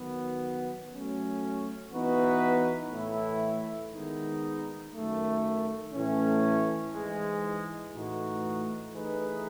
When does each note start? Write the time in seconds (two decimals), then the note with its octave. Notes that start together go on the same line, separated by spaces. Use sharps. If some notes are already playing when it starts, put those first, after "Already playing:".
Already playing: D#3 F#3 B3
0.91 F#3 A3 C#4
1.91 E3 B3 D#4 F#4 B4
2.92 A2 E3 A3 E4
3.92 D#3 G#3 B3 D#4
4.92 F#2 D#3 A3
5.93 A2 E3 A3 C#4
6.93 G#2 E3 G#3
7.93 A2 E3 A3 D#4 F#4
8.93 E3 A3 D#4 G#4 B4